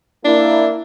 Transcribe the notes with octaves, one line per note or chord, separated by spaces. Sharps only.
A#3 D4 E4